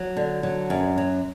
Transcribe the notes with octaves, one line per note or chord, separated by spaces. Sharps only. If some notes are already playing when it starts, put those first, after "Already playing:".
Already playing: F#3
D3
F#3
F#2
F#3